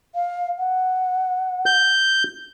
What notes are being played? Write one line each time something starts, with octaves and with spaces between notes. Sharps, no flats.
F5
F#5
G6